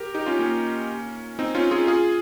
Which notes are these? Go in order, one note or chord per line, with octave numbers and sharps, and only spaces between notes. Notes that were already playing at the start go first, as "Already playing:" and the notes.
Already playing: G4 A#4
D#4 G4
C#4 F4
A#3 C#4
C4 D#4
C#4 F4
F4 G#4
F4 G#4